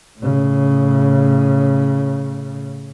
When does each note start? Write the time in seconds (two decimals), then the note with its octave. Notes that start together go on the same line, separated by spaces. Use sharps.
0.19 A2 C#3